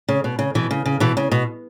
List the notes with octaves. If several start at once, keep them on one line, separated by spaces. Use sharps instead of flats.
C#3
B2
C#3
B2 E3
C#3
C#3
B2 E3
C#3
B2